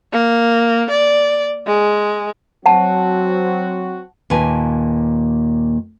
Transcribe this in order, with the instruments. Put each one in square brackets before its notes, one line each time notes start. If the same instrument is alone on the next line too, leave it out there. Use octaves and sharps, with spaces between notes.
[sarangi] A#3
D5
G#3
[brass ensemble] F#3 C4 F#4 [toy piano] F#5 A5
[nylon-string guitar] D#2 A#2 B4 G#5 A5